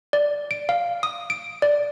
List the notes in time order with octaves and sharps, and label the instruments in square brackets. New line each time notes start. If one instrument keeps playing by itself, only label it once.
[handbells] D5
D7
F5
D#6
D7
D5